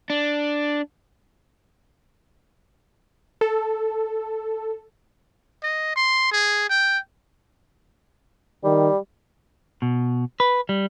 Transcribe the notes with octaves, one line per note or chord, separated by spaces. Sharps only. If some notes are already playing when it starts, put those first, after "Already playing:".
D4
A4
D#5
C6
G#4
G5
D#3 G3
B2
B4
G3